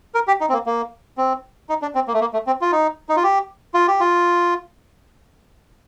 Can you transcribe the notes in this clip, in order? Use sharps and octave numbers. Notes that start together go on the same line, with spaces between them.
A#4
G4
D#4
C4
A#3
A#3
C4
D#4
D4
C4
A#3
A3
A#3
A3
C4
F4
D#4
D#4
F4
G4
F4
G4
F4